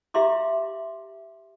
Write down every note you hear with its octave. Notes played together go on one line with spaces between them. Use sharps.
G4 E5 F5 A#5 C6 D6